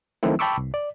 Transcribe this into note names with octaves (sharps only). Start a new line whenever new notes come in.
D#3 F3 F#3 A3 C4 E4
G5 A5 B5 C#6 D6 E6
C2
D5